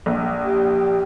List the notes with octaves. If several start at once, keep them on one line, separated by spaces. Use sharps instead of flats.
A#1
G4